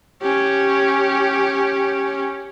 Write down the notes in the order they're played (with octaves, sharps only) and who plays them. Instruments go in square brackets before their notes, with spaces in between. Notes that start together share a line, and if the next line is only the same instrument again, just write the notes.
[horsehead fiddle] C#4 G4